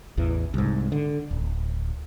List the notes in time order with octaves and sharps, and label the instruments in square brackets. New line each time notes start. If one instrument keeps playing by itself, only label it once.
[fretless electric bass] A1 E2 E3
C2 G#2
D3
D1